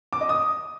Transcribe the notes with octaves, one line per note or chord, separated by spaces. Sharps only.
D6
D#5
D#6